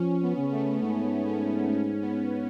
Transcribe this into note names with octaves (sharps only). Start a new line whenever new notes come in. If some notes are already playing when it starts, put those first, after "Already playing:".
Already playing: F3 C#4
B3
C#3
A3
G#2 B3
C#4
C#4
B3